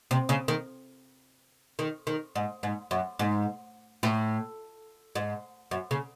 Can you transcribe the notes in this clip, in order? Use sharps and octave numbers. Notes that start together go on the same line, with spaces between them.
C3
C#3
D#3
D#3
D#3
G#2
G#2
F#2
G#2
A2
G#2
F#2
C#3